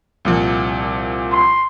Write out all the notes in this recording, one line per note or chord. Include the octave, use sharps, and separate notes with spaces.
C2 A#2 F3
C6